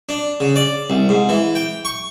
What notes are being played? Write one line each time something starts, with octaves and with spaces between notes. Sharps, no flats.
D4
C#3
D5
C2
G#2
E3
G5
C#6